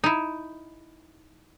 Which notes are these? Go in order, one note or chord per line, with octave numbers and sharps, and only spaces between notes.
D#4 E4